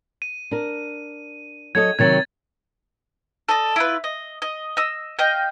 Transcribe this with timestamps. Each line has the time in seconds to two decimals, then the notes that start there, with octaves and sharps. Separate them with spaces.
0.22 D#7
0.51 D4 A#4
1.75 F#3 A4 D#5 G#6
1.99 C3 D#3 F#3 G#6 A6
3.49 A4 D5 D#5
3.76 E4 F4 B4
4.04 D#5
4.42 D#5
4.77 D#5 E6
5.19 D#5 F5 G5